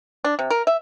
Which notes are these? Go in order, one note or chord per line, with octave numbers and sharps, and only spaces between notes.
D4
C3
A#4
E5